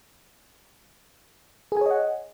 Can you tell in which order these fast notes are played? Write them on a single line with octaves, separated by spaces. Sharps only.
G#4 G#5 C#5 D#5 F#5